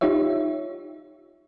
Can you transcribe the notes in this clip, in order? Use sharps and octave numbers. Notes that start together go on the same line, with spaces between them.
D#4 F4 G4 C#5 E5